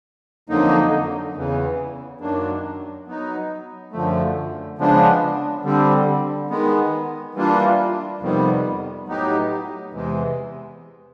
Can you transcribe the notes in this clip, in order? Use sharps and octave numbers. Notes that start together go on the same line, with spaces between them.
F2 D3 F#3 A#3 D#4
E2 C#3 E3
F#2 D#3 F#3 A#3 D4
F#3 B3 D#4
F#2 D3 F3 A3
C#3 F3 G#3 B3 D4
D3 G3 C4
D#3 G#3 B3
E3 G3 A#3 D4 F4
F2 C3 D#3 G3 B3
A2 F#3 B3 D#4 G4
E2 C3 E3 G#3